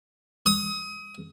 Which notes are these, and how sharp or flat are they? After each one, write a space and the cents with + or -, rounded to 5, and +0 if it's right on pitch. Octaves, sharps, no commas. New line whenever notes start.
D#6 +30